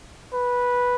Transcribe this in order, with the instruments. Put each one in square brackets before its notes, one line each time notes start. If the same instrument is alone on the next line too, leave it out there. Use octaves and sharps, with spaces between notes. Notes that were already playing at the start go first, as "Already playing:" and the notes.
[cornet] B4